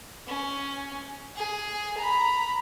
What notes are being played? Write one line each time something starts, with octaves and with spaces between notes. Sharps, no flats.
C#4
G#4
A#5 B5